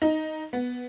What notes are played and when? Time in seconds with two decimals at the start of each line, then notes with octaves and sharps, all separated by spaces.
0.02 D#4
0.53 B3